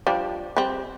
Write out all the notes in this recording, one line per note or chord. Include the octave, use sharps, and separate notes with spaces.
F3 G3 D4
G3 C4